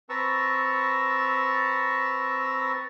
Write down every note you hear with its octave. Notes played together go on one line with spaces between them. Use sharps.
C4 B4 A5 A#5 C#6 E6